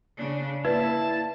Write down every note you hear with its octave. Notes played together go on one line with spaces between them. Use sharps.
C#3 D4
A#3 E4 B4 D5 E5 A5